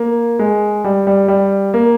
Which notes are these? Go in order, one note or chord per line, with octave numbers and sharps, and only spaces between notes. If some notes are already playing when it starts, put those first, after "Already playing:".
Already playing: A#3
G#3
G3
G3
G3
A#3